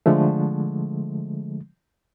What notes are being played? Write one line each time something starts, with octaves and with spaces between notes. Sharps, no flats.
D3 F3 G#3 A3